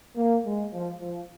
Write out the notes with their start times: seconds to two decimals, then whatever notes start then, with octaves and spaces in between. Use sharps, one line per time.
0.16 A#3
0.44 G#3
0.73 F3
1.01 F3